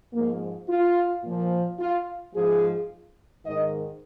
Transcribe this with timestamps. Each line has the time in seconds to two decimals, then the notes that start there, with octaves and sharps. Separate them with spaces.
0.12 G#2 F3 A#3
0.68 F4
1.23 A#2 F3
1.79 F4
2.34 G#2 F3 G#4
3.44 G#2 D#3 D#5